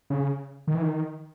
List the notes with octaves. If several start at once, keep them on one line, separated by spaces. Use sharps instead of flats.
C#3
D#3
E3
D#3